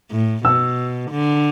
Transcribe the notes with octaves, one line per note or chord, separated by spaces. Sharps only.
A2
B2 E6
D3